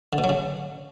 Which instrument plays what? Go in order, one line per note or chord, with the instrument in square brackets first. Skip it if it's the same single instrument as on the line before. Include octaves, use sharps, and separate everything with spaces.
[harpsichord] D3
B2
F#3
C#3